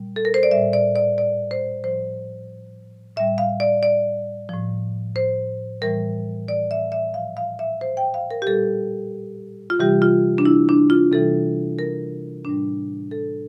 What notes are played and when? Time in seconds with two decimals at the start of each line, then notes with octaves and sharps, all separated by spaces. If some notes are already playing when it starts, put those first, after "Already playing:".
Already playing: A#2 G3
0.16 A4
0.25 A#4
0.34 C5
0.43 D5
0.51 A2 G3 E5
0.73 D5
0.96 D5
1.18 D5
1.51 C5
1.84 A2 F3 C5
3.16 A2 G3 E5
3.38 F5
3.60 D5
3.83 D5
4.49 A2 F3
5.16 C5
5.82 A2 E3 G3 A#4
6.48 D5
6.71 E5
6.92 E5
7.14 A#2 F3 F5
7.37 F5
7.59 E5
7.81 C5
7.97 G5
8.14 F5
8.31 A#4
8.42 G4
8.47 A#2 G3 A4
9.70 F4
9.79 C3 E3 G3 G4
10.02 F4
10.38 D4
10.45 E4
10.69 D4
10.90 F4
11.12 C3 E3 G3 A4
11.79 A#4
12.45 A2 G3 D4
13.11 A4